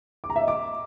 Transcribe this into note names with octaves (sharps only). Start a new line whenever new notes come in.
D6
A#5
E5
D#5
D6